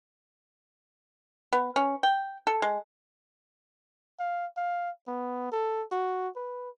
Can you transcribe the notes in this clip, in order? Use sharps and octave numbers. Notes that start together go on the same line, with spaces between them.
B3
C#4
G5
A4
G#3
F5
F5
B3
A4
F#4
B4